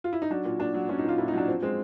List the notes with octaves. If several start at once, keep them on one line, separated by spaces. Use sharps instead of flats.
F4
E4
D#4
F#3 D4
A#2
A#2 D4
F#3
F#3 C#4
D#4
A#2
F4
A#2 E4
D#4
F#3 D4
F3 C4
G#3 C4